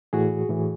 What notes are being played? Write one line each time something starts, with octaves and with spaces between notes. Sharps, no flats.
A2 E3 F#4 G#4
A2 E3